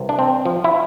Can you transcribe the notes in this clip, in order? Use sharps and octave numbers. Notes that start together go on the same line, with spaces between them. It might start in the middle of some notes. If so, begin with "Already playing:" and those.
Already playing: C2 C3 E3
D4
C4
F3
E4